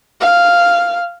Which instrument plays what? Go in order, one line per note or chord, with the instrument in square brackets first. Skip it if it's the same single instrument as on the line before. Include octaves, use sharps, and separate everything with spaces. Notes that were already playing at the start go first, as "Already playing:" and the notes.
[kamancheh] F5